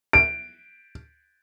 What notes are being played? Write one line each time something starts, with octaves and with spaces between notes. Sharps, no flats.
D7